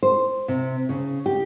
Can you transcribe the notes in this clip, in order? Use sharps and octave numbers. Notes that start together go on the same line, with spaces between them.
C5
C3
C#3
G4